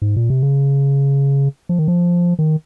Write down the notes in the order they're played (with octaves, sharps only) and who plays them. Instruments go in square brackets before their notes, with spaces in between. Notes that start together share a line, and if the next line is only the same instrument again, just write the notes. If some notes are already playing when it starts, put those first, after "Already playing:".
[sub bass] G#2
A#2
C3
C#3
F3
D#3
F3
D#3